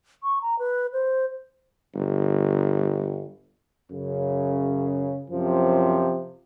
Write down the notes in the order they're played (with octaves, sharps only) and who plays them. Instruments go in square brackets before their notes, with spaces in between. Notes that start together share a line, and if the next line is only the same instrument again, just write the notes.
[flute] C#6
A#5
B4
C5
[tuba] G1
[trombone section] F#2 C#3
F#2 C3 F3